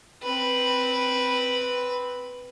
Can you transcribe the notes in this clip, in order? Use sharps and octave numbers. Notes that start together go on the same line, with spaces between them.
C4 B4